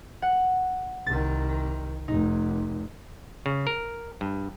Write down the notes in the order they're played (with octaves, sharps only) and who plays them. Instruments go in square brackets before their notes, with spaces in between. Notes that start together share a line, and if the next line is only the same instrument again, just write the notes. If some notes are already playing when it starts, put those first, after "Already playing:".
[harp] F#5
[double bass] C2 D#3 [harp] A6
[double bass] F1 [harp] D#4
[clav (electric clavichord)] C#3
A#4
G2